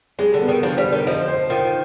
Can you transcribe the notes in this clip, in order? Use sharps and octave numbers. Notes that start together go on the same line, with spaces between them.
G3 G#3
D3
B3
D#3
D3 F3
G3
D3
D#3
F3 D#5
C5
D#3 F4